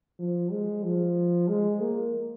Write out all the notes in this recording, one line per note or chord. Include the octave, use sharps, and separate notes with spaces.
F3
G#3
F3
G#3
A#3